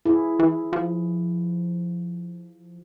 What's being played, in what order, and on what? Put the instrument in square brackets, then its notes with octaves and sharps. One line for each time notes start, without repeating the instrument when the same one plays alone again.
[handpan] E4 G#4
[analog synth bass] E3
F3